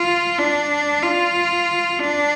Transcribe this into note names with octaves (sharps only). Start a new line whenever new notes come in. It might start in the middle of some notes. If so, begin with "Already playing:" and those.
Already playing: F4
D4
F4
D4